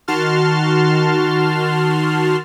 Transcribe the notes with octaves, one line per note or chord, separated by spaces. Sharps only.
D#3 F#4 A5 C6 F6